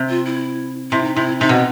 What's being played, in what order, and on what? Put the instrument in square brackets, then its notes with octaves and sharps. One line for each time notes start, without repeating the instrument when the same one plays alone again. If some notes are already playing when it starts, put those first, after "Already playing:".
Already playing: [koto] C3
[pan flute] F4
E4
[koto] C3 [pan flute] E4
[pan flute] D#4
[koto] C3 [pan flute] E4
[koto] C3 [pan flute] D#4
[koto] B2